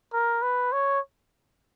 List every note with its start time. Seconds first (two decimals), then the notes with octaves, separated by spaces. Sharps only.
0.13 A#4
0.42 B4
0.73 C#5